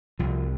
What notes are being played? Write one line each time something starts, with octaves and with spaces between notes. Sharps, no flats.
C2 F3